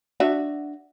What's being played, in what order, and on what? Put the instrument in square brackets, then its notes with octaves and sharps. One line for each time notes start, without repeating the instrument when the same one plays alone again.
[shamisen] D4 F#4 E5